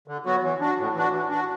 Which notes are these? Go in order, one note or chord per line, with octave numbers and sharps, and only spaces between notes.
D3
F#3 B3 F#4
E3
D4 F#4
A2
E3 D4 F#4
E3
D4 F#4